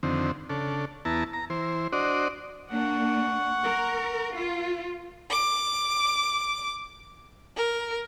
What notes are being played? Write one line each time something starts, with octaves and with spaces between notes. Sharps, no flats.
F2 D3 D#3 C4
C#3 D4 A4
E2 B3 E4 A5 A#5
A#5
E3 C5
D4 F#4 C5 D5 D#5
A#3 D4 F#5 C#6
A#4
F4
D6
A#4